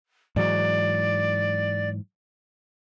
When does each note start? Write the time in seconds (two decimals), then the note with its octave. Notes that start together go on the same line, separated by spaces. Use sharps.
0.36 G#2 E3 F#3 D5